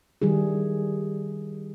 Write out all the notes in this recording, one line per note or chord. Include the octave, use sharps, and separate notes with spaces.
D#3 G3 E4 G#4